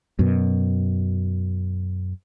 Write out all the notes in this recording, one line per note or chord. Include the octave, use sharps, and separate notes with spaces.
F#2 B2